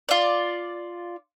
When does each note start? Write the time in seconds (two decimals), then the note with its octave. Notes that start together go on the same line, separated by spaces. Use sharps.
0.09 F4 D5